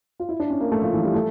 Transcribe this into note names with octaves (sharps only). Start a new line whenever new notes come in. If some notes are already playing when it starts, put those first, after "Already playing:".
F4
E4
D4
C#4
A#3
A3
F3
E3
G3
A3